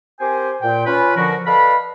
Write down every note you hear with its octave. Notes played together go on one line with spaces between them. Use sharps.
C4 G4 A#4 C5 G5 G#5
A#2 G5
C#4 F4 B4 B5
D3 F3 F#4 A#4
A4 B4 D5 D#5 F5 B5